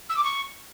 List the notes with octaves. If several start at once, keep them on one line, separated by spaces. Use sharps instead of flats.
E6
D6
C#6